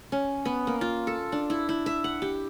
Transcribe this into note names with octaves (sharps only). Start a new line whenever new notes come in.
C#4
B3
A#3
F4
A4
D4
E4
E4
E5
F#5
G4